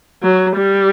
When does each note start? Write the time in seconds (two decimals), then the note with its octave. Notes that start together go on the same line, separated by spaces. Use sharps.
0.23 F#3
0.57 G3